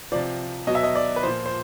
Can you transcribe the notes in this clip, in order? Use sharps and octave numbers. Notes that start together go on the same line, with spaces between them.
C3 F3 D5
B2 F#3 D#5
E5
D#5
D5
B4
A#2 F3 C5
C5